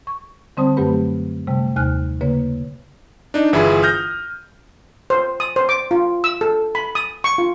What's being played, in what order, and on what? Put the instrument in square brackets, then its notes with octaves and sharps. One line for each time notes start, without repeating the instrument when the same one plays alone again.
[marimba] C#6
D3 G3 C4 C5 A5 D#6
F#2 F#3 A3 G4 B4 B5
C3 G3 A3
D#2 C3 G#5 F6 F#6
C#3 A#3 B4 C#5
[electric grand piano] D4 D#4
G1 E3 E4 F4 G#4 B5
D#6 F6 G6 A#6
[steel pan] C5
D#6
C5
D6
F4
E6
A4
B5
D#6
C#6
F4